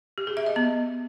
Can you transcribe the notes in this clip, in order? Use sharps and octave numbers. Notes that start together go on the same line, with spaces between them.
G4
G#4
E5
D#5
B3